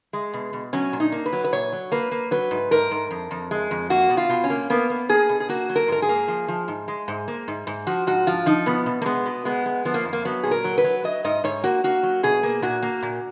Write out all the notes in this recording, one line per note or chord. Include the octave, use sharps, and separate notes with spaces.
G#3
B2
B2
F#3 C#4
A#2
D#4
A#3
B4
F#3
B4
A#2 C#5
F#3
A#3 B4
A#3
F#3 B4
G#2
G#2 A#4
G#2
F2
F2
G#3
F2
A#3 F#4
B2
F4
B2
C#4
A#3
A#3 B3
A#3
A#3 G#4
B2
G#4
A#3 F#4
F#3
A#4
G#2 A#4
G#4
A#3
F3
F3
G#2
G#3
G#2
A#3
G#2
G#2
F3 F#4
G#2 F#4
F3 F4
F3 D#4
B2 B3
B2
A#3
G#3 B3
B2
G#3 B3
G#3
F3 B3
A#3
F2
A#3
F#3 B3
A#2 G#4
A#4
F#3
B4
F#3
F#3 D#5
G#2 D#5
G#2 C#5
A#3 F#4
A#3 F#4
F#3
B2 G#4
A#3
A#2 F#4
A#3
A#2